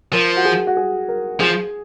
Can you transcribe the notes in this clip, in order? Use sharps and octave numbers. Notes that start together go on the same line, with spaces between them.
F3 A#4
F#4
G#4
F#4
G#4
A#4
F3 G#4